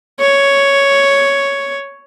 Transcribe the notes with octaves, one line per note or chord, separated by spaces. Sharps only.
C#5